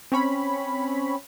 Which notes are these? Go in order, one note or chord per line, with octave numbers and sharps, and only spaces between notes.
C4 C#4 C#5 B5